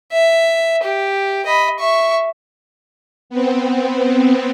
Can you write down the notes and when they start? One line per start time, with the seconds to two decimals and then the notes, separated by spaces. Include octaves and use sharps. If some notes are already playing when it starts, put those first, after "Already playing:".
0.12 E5
0.83 G4
1.45 D#5 B5
1.79 E5 C#6
3.30 B3 C4